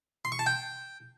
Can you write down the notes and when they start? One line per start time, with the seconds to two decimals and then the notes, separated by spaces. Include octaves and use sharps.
0.25 C6
0.32 C#6
0.39 A5
0.46 G5